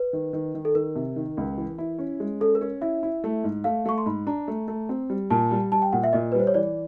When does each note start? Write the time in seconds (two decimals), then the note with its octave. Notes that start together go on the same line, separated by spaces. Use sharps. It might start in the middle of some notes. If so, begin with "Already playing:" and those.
Already playing: B4
0.13 D#3
0.33 D#3
0.55 D#3
0.65 A4
0.75 D#3 A#4
0.96 C3
1.16 D#3
1.37 C#2
1.58 E3
1.78 E4
1.99 C#4
2.20 G#3
2.40 C#4 A4
2.55 A#4
2.61 C#4
2.81 E4 E5
3.03 E4
3.24 A3
3.44 G#2
3.64 A3 F5
3.85 A3 C#6
3.98 C6
4.06 G#2 B5
4.27 D4 A#5
4.48 A3
4.68 A3
4.89 C4
5.10 G3
5.30 A#2 A5
5.51 G3
5.72 G3 A5
5.82 G5
5.93 A#2 F#5
6.03 E5
6.13 A#2 D#5
6.32 B4
6.35 G3
6.40 C5
6.47 C#5
6.54 E3 D5